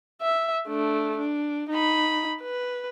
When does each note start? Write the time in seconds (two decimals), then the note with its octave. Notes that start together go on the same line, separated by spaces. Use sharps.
0.22 E5
0.67 A3 D4
1.17 D4
1.70 D#4 B5
2.42 B4